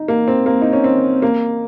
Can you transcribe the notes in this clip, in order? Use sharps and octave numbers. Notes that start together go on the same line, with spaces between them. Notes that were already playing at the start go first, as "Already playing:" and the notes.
Already playing: D#4
A#3
C4
A#3
D#4
C#4
C4
A#3